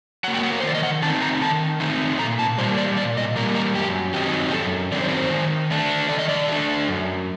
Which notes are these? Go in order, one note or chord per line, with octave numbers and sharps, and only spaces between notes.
F#3 A#3 F#5
G5
F#5
A#4
C5
D#3 D5
D#5
F#5
A3 C4 D#4 A5
A#5
D#3 A5
A3 C4 D#4
A#2 A#5
A5
G3 A#3 C5
D5
A#2 D5
D#5
G3 A#3 A#4
A#4
F#2 G4
D#3 F#3 C4 D#4 G4
G4
F#2 A4
D#3 F#3 C4 D#4 D5
C5
A#4
C5
D#3
A3 D4
D#3 D5
D#5
D5
A3 D4
F#2